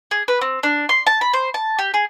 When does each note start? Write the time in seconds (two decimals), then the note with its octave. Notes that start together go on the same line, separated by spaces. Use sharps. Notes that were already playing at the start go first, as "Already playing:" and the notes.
0.11 G#4
0.28 B4
0.41 C4
0.63 D4
0.89 C6
1.07 A5
1.21 B5
1.34 C5
1.54 A5
1.79 G4
1.94 G#4